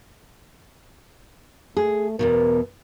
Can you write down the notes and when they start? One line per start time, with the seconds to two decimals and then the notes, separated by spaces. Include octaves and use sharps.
1.77 A3 G#4
2.19 E2 G#2 B2 A#4